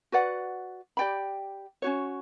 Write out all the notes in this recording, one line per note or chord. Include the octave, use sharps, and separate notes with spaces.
F#4 B4 D5 F#5
G4 D5 G5 B5
C#4 F#4 C#5